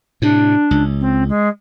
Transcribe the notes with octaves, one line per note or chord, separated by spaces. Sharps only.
A2 C3 D4
C#2
C4
G#3